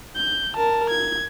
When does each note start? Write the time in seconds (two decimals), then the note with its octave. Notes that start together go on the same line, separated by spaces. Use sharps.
0.16 G6
0.57 A#4 A5
0.90 G#6